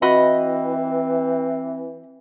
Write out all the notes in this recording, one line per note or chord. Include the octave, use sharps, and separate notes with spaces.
E3 C4 F#4 D#5 B5